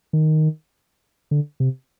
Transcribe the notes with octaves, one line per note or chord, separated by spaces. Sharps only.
D#3
D3
C3